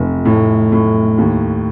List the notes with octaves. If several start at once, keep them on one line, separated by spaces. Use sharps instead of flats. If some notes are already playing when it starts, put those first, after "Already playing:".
Already playing: F1
A2
A2
D#2